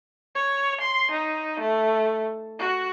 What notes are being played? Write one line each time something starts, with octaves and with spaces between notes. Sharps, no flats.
C#5
C6
D#4
A3
F#4